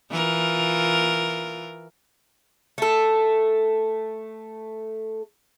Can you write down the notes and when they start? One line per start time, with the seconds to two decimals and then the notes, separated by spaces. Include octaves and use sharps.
0.10 E3 F4 A#4
2.78 A3 A4